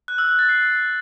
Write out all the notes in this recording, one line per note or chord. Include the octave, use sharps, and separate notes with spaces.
F#6
E6
F#6
A6
C7